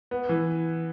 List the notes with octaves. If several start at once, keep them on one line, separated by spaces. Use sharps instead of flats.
B3
E3